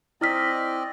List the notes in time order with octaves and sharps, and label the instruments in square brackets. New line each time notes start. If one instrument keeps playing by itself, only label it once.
[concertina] C4 D5 D#5 [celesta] E4 F6 B6